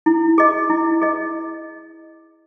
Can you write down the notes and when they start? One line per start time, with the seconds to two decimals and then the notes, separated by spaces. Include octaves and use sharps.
0.06 E4
0.38 G#4 D#5
0.70 E4
1.01 G#4 D#5